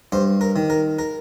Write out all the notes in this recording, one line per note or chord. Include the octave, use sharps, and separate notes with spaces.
G2 C5
A#4
D#3
A#4
A#4